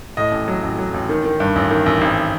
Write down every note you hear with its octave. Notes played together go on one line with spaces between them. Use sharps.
A2 D#5
A1
F#3
A1
F#3
A1
D#3
D#3
G2
A1
D#3
A1
G#1